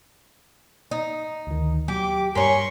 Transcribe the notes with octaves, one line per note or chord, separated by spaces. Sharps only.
D#4
D2 D#3
F#3 G4 D6
G2 A#4 C#5 G#5 C6 C#6 B6